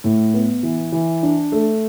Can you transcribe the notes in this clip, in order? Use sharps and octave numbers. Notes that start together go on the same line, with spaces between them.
A2
B3
E3
E3
D4
A3